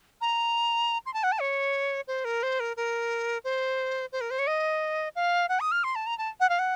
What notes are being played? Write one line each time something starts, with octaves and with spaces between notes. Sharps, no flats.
A#5
C6
A5
F#5
A5
C#5
C5
A#4
C5
A#4
A#4
C5
C5
A#4
C5
C#5
D#5
F5
F#5
D#6
F6
C6
A5
A#5
A5
F#5
F5
F#5